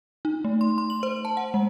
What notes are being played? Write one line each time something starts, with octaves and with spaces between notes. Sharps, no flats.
D#4
A3
C6
C6
F#7
C5
A5
F#5
G#3